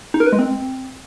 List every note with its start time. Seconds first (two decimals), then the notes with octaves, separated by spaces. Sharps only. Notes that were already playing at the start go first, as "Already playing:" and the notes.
0.14 D#4
0.20 A#4
0.26 B4
0.33 G#3
0.39 C4